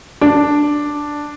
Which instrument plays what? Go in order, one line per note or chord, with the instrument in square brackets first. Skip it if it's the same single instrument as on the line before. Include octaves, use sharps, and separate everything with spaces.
[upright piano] D4